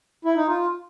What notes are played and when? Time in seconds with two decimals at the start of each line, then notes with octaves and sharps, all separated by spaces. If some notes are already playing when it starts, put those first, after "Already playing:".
0.25 E4
0.36 D#4
0.47 F4